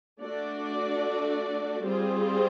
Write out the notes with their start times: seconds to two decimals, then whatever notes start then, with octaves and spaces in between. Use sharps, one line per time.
0.21 A3 D4 F#4 A4 D5
1.83 G3 C4 F4 G#4 C5